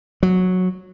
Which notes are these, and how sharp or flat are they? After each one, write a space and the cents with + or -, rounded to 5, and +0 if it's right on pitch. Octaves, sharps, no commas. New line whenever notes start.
F#3 -10